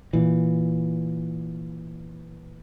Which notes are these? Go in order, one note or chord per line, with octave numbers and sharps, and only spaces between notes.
A#2 E3